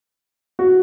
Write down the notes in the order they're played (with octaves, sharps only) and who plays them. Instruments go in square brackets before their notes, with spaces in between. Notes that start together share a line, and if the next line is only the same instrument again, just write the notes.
[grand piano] F#4